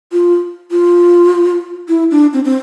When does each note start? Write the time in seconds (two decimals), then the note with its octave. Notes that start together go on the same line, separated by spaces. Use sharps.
0.12 F4
0.71 F4
1.89 E4
2.11 D4
2.33 C4
2.45 C4